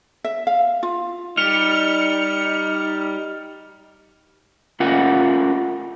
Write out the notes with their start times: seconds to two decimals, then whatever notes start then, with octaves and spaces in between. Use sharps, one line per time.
0.24 E5
0.47 F5
0.83 F4
1.37 G3 D#4 F6 C#7 F7
4.80 A3 C#4 F4 A#4 F#5